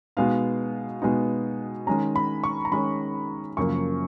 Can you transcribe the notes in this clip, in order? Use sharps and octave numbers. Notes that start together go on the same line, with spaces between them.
B2 G#3 B3 D#4 F5
B2 G#3 B3 D#4
D#3 G#3 C#4 A#5
B5
C#6
A#5
D#3 G#3 C#4 B5
F#2 C#3 F3 A#3 C#6